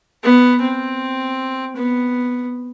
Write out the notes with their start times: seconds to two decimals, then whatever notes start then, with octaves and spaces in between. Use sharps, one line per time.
0.24 B3
0.62 C4
1.76 B3